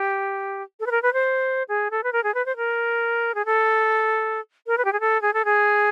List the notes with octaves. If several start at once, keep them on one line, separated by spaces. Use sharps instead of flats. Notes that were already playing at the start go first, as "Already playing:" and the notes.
Already playing: G4
A4
B4
A#4
B4
C5
G#4
A4
B4
A#4
G#4
B4
C5
A#4
G#4
A4
A#4
B4
G4
G#4
A4
G#4
A4
G#4